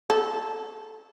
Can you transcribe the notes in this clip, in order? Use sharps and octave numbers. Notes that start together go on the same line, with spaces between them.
A4